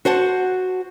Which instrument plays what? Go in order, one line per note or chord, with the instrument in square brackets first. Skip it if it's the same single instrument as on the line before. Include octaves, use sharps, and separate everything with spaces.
[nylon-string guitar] F#4 C5 F#5 A5